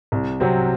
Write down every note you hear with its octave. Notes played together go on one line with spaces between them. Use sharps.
C2
C3 F#3 C4